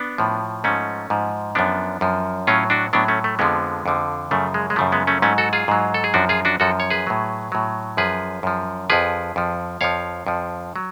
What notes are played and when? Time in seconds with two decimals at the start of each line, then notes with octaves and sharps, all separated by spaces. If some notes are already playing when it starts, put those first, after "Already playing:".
Already playing: B3 D4
0.18 A2 F3
0.64 G#2 F3 A3 C#4
1.10 G#2 F3
1.55 F#2 F3 B3 D4
2.01 F#2 F3
2.47 A2 F#3 C#4 F4
2.70 D4 F#4
2.93 A2 F#3 B3 D4
3.08 A3 C#4
3.24 A3
3.39 F2 D3 F3 G#3 B3
3.86 F2 D3 F3
4.31 F#2 C#3 F3 A3
4.54 G#3
4.70 G#3
4.76 F#2 C#3 F3 A3
4.92 G#3 B3
5.07 A3 C#4
5.22 G#2 F#3 A3 C#4
5.38 F#4 A4
5.53 F4 G#4
5.68 G#2 F#3
5.94 A4
6.04 G#4
6.14 F#2 F3 D4 F#4
6.29 F4 G#4
6.45 D4 F#4
6.60 F#2 F3 F#4 A4
6.80 C#5
6.90 G#4 B4
7.07 A2 F#3
7.52 A2 F#3
7.97 F#2 F3 G#4 B4
8.43 F#2 F3
8.90 F2 F3 G#4 B4
9.36 F2 F3
9.81 F2 F3 C#5 F5
10.27 F2 F3
10.76 F#3